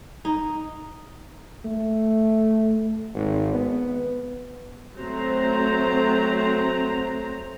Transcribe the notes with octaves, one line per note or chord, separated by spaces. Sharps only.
D#4
A3
G#1
B3
F#3 A3 C4 C5 A#5